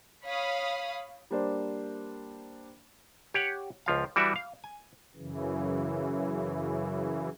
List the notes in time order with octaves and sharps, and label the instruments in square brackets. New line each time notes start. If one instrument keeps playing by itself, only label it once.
[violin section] C#5 F5 B5 D#6
[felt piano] G3 A#3 D4 A#4 C5 D5
[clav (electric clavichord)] G4 C#5 F#5
C#2 F3 F5
E3 G3 F#4 D5 E5
F5
G#5
[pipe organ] F#2 C#3 E3